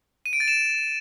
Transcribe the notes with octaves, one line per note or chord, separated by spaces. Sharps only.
D#7
D7
A6
E7